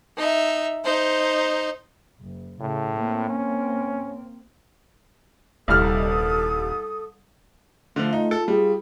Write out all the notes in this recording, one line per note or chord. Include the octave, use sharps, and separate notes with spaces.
D#4 E5
D#4 C5
F#1
A2 C#3
A#3 C4
C#4
D#1 C2 G3 A4 D#6 F6
D3 F3 A3 F4
D#4
A4
G3 G#4